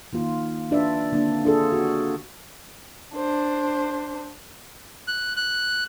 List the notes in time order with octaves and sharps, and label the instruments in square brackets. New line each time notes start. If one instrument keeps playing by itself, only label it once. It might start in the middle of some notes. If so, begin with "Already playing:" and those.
[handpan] D#3 A#3 F4
D4 F4 B4 D5 E5
D3 A#3 C4 D4
D4 F4 G#4 A4
F#4
[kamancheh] D4 C5
[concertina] F#6
F#6